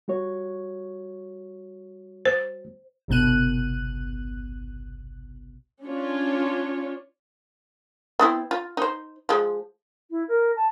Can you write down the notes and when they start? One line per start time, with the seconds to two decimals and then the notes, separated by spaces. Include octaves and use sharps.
0.08 G3 F#4 C#5
2.25 C5
3.08 G1 C2 B2 F#6 D#7
5.85 C#4 D4 F4 C#5
8.19 B3 C4 E4
8.51 F4
8.77 D#4 C5
9.29 F3 G#3
10.10 E4
10.28 A#4
10.56 A5